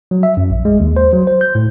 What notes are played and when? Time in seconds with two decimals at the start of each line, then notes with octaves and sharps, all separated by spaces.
0.11 F#3
0.23 E5
0.37 F#2
0.50 A#1
0.65 G#3
0.80 D#2
0.97 C5
1.13 F#3
1.27 C5
1.41 G6
1.55 A2